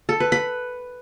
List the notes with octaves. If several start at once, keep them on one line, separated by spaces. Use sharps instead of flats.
A4
B4
B5